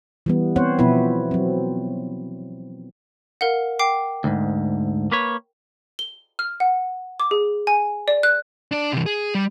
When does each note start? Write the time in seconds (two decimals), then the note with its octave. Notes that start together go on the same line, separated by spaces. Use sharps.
0.26 E3 G3 B3
0.56 B3 C4 C5 C#5 F#5
0.79 B2 F3 B3 E4 B4
1.31 F#3 C4
3.41 A#4 F5 F#5
3.79 G5 D6 C7
4.24 D2 G#2
5.12 A#3 B4 C#5
5.99 G7
6.39 F6
6.60 F#5
7.20 D6
7.31 G#4
7.67 G#5
8.08 D5
8.23 F#6
8.72 D4 D5
8.92 C3 E3
9.06 G#4
9.35 G3